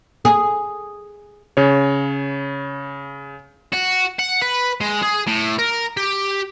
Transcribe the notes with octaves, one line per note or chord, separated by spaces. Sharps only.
G#4
C#3 C#5
F#4
F#5
B4
G#3
G#4
A2
A#4
G4